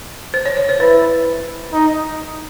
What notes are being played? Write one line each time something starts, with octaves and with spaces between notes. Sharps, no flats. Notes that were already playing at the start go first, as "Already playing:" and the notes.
C5
C#5
C#5
C5
E4 B4
D#4